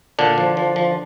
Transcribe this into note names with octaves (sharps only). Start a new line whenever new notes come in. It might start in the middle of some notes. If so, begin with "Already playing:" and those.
A#2 D3 D4
F3
F3
F3